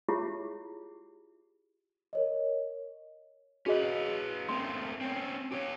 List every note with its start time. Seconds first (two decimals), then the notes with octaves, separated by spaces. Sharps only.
0.09 E4 F4 G4 G#4 C#5 E5
2.13 A#4 C#5 D#5
3.66 C#4 F#4 G#4 B4 D#5
4.49 A3 A#3 C4 C6
5.01 C4 C#4
5.52 G4 C5 C#5